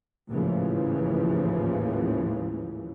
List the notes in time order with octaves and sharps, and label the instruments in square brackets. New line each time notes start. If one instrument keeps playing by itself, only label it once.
[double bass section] A1 D#2 G#2 C#3 E3 F3